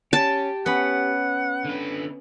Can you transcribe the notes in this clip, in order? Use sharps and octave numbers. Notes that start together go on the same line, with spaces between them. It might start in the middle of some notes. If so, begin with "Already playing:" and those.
C#4 G4 A5
B3 C#4 F#5 B5
D3 B4